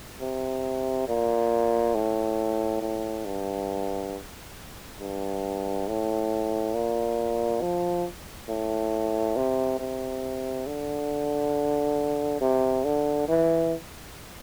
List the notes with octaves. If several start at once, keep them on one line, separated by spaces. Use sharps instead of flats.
C3
A#2
A2
A2
G2
G2
A2
A#2
F3
A2
C3
C3
D3
C3
D3
E3